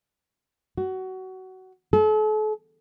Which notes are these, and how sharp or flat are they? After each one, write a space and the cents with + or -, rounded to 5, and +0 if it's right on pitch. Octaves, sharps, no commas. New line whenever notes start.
F#4 +20
A4 -40